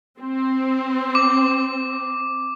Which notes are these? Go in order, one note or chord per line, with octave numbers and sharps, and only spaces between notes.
C4
D6